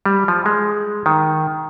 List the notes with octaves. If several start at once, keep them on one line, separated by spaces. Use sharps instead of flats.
G3
F3
G#3
D#3